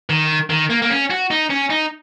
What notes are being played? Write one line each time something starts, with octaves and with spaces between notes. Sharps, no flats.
D#3
D#3
A#3
A#3
C#4
F#4
D#4
C#4
D#4